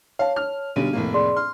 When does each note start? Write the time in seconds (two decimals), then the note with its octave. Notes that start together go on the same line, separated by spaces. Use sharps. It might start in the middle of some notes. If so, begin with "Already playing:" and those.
0.19 C#5 F5 A5
0.36 F6
0.76 B1 D3 G3 D#7
0.93 F1 A2 A#3
1.14 G#4 D5 C6
1.36 C6 F6